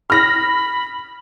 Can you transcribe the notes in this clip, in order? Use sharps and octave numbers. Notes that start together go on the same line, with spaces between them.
B5 F6 A#6